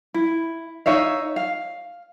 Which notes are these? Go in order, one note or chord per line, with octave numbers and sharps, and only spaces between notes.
E4
D#4 C#5 E5 F5
F5